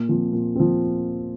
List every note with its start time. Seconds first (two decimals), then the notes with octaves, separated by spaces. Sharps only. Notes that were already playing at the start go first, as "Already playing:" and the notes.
Already playing: A#2
0.09 F3 C4
0.33 A#2
0.56 F3 C4